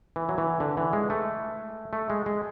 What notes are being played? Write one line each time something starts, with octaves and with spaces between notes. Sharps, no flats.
E3
F#3
E3
D3
E3
G#3
A3
A3
G#3
G#3